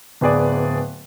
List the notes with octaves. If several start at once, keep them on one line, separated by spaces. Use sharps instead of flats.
D1 B3 G#4 D5